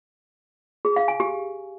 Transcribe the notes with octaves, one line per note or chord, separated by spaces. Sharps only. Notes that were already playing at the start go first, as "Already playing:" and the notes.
G#4
F5
G#5
G4